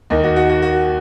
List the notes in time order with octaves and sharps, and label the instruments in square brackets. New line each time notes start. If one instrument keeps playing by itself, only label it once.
[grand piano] D#2 D#3 D#4
F#4
F#4
F#4
F#4